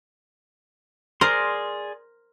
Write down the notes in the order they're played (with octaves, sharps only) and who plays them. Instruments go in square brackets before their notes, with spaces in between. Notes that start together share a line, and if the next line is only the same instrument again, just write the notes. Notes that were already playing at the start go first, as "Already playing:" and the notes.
[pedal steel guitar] G#4 D5 C6 [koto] A#4 C5